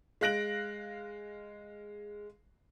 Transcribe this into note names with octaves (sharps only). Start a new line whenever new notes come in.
G#3 F5 F#6 A#6 D7 F#7